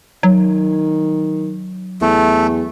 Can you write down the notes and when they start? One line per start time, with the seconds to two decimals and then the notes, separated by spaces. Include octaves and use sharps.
0.23 D#3 F#3
2.01 E2 A3